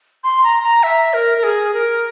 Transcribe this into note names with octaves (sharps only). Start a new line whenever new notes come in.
C6
A#5
A#5
E5
A#4
A#4
G#4
A#4